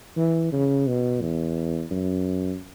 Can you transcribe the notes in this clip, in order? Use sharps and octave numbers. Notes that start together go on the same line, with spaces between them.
E3
C#3
B2
E2
F#2